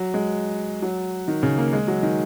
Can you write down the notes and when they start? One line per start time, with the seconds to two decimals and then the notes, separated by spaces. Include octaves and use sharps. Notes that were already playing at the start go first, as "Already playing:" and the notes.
Already playing: F#3
0.14 G#3
0.82 F#3
1.28 D#3
1.43 C#3
1.58 A#3
1.73 G#3
1.88 F#3
2.03 D#3